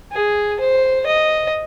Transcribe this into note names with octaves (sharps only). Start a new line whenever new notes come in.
G#4
C5
D#5